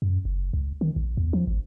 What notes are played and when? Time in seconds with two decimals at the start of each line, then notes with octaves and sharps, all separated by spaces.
0.02 F#2
0.25 F#1
0.53 C#2
0.81 D#3
0.96 A#1
1.17 E2
1.33 F3
1.47 G#1